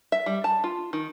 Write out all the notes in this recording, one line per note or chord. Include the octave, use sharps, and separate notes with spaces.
E5
G3
A5
F4
D#3